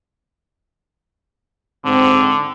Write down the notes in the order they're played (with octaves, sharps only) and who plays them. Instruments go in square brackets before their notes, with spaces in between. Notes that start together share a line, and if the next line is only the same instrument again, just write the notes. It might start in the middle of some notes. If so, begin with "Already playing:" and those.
[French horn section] G#2 C4 [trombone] D3